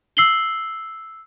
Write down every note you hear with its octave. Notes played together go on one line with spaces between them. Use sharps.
E6 C7 F#7 G7